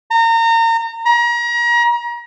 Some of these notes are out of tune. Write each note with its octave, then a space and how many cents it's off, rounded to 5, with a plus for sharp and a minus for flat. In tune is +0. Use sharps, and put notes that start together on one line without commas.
A#5 -30
A#5 +35